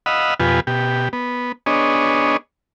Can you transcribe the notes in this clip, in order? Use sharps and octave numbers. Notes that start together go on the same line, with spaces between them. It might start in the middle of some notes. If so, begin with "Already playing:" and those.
D#5 F5 F#5 B5 E6
F2 B2 F4 G4 B4 G#5
B2 G4
B3
B3 D4 G#4 C#5 D#5